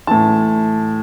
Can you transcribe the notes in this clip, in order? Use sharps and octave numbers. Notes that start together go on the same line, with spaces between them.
A2 E3 A5